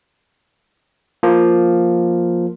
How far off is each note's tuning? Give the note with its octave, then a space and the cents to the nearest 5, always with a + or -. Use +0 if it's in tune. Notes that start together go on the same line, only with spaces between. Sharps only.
F3 +0 A#3 +0